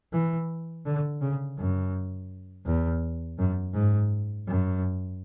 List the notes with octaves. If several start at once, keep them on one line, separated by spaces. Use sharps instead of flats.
E3
D3
C#3
F#2
E2
F#2
G#2
F#2